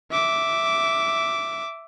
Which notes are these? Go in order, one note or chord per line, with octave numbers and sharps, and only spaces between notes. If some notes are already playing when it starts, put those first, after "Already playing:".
E5 D6